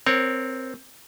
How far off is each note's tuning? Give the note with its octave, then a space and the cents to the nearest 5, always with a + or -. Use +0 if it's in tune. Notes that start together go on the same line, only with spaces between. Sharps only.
C4 +0 A#4 +0 C#5 -10